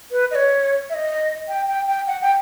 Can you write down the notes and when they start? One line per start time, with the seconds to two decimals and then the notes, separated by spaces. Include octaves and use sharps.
0.11 B4
0.31 D#5
0.35 C#5
0.90 E5
0.94 D#5
1.48 G5
1.68 G5
1.87 G5
2.07 F#5
2.22 G5